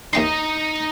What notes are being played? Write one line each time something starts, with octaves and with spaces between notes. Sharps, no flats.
D#2 D#4 D#5 G5 C6